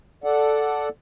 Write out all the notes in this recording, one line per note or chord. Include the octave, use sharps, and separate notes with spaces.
A4 D5 F#5